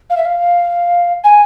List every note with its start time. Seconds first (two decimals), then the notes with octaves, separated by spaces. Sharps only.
0.10 F5
0.17 E5
0.25 F5
1.24 G#5